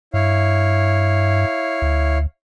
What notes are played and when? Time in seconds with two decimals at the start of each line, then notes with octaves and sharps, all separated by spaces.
0.14 G2 E4 C#5 F5
1.82 D2